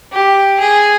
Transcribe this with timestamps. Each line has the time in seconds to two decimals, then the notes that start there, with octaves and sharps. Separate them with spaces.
0.12 G4
0.60 G#4